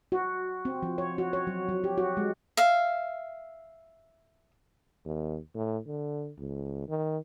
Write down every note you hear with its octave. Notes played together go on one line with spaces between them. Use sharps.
F#4
C4
F3
C#5
F#4
C#5
F#3
F#3
G4
F#4
G#3
E5 F5
D#2
A2
D3
C#2
D#3